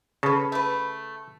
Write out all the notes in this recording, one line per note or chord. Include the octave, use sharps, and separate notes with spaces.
C#3 A4 B4
A3 B4